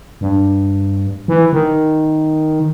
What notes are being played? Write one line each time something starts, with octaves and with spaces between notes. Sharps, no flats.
G2
E3
D#3